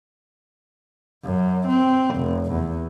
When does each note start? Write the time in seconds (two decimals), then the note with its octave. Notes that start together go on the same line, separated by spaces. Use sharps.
1.25 F#2
1.68 C4
2.16 F1
2.53 E2